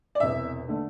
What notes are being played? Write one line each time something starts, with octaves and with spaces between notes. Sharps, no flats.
D5
E1 E2 C3 E5
D3 A3